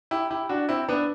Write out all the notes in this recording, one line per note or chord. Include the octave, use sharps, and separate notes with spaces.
E4 G4
E4 G4
D4 F#4
C4 E4
B3 D4